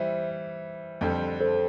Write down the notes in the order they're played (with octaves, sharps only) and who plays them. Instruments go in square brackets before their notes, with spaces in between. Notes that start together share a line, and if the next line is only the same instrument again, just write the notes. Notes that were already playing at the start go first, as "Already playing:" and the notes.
Already playing: [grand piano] E3 G3 [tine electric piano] C5 E5
[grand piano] F2 D3 G3 C4
[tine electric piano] A4 C5